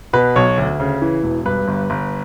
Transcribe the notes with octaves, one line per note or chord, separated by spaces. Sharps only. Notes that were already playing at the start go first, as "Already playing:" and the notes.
B2 B4
B1 C#5
D2
C#3
E3
E1
G2 B4
G1
G1